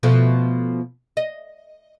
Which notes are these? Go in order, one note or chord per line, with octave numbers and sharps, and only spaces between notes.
B2 F3 A3
D#5